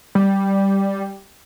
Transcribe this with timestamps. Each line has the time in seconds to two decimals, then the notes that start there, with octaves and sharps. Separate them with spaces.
0.15 G3